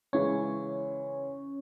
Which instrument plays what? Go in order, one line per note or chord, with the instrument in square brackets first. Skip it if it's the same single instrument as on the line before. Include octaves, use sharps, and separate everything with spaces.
[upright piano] C#3 E3 G#3 [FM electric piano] C#4 C#5